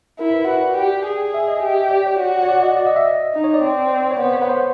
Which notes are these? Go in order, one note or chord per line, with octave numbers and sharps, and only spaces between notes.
E4 A#4
B4
F#4 B4
D5
G4
G#4
E5
D#5
G4
D5
C#5
F#4
C#5
D5
D#5
D5
D#5
E5
D#5
D#4
C#5
D5
C4
C#5
B3 C5
C#5
C5
B4